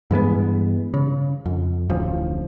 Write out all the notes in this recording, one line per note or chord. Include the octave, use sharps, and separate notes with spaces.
G2 E3 G#3 B3
C#3
F2
D1 A1 F3